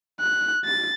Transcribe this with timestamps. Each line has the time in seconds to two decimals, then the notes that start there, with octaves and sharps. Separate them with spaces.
0.21 F#6
0.65 A6